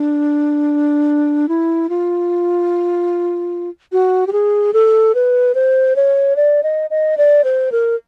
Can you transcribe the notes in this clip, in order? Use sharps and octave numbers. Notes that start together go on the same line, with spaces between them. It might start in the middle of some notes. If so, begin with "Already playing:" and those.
Already playing: D4
E4
F4
F#4
G4
G#4
A4
B4
C5
C#5
D5
D#5
D#5
D5
C5
A#4